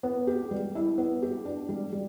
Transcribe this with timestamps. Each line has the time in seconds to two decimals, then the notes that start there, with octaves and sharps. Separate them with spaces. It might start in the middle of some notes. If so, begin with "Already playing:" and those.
0.03 B3
0.27 G4
0.51 G3
0.75 E4
0.98 B3
1.22 G4
1.45 D4
1.69 G3
1.93 G3